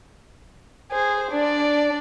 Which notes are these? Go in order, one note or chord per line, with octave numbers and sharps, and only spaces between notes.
G#4 C5
D4 D5